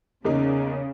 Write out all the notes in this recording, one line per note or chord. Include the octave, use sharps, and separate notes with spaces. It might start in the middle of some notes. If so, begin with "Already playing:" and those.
E2 C#3 A#3 D#4